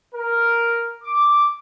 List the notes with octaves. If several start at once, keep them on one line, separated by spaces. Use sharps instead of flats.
A#4
D6